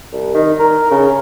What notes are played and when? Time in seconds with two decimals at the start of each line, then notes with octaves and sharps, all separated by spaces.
0.12 C2
0.34 D#3
0.59 A#4
0.91 C#3